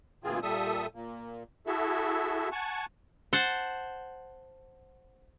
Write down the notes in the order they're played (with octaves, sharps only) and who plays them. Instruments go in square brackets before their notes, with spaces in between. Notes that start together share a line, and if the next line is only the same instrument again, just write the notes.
[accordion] D2 A#2 E3 C4 F4 G#4
A#2 G3 A4 E5 D#6
A#2 A#3
E4 F#4 G#4 A4 E5
F#5 G#5 A5 C#6
[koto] C5 F#5 A5